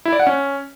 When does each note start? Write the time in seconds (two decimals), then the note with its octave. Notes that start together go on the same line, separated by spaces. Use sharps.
0.05 E4
0.12 D5
0.20 F#5
0.27 C#4